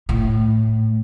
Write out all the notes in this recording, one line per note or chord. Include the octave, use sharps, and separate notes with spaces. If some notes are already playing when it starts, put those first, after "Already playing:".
A2